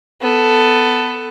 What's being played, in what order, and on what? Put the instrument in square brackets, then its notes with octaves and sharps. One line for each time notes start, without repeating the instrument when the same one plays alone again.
[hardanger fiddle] B3 A4